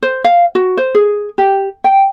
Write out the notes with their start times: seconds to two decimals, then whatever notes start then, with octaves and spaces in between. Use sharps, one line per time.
0.02 C5
0.24 F5
0.55 F#4
0.77 C5
0.95 G#4
1.38 G4
1.84 G5